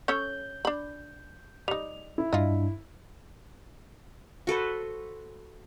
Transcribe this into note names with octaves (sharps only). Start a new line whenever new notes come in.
C#4 A4 C#5 G6
D4 B5
G3 D#4 F7
E4
G2 D4 F4 D#5
F#4 A4 B4 C5